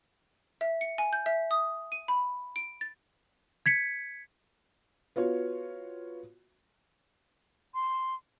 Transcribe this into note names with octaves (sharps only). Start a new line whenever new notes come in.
E5
C#7
G#5
G6
E5
D#6
D#7
B5
D7
A6
G#6 B6 C#7
B3 F4 F#4 C#5
C6